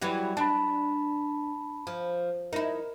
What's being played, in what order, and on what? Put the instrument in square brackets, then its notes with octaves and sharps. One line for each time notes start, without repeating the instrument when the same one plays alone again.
[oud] E3 F#3 G3
[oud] D4 [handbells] A5 B5
[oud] F3
[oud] D#4 E4 [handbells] A#4